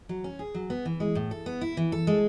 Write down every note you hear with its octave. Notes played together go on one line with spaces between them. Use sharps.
F#3
C#4
G#4
F#3
B3
E3
G#3
A2
A4
B3
E4
E3
A4
G#3